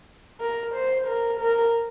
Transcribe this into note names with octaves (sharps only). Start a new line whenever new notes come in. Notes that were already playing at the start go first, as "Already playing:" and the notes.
A#4
C5
A#4
A#4